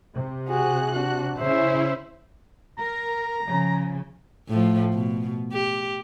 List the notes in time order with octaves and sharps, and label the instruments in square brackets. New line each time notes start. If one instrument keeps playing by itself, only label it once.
[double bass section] C3
[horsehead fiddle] F#4 G#4 [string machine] F#6
[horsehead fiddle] D4 F#4
[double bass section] C#3 [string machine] C#4 E4 [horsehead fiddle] C5 E5
[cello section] A#4 [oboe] A#5
[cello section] C#3 F3
[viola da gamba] A2 F3
B2
G4